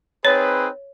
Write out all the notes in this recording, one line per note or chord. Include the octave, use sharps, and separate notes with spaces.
C4 D#4 G#4 B4 C#5